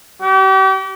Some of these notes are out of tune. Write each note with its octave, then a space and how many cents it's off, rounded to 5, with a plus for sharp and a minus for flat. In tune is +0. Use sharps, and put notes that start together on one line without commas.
G4 -40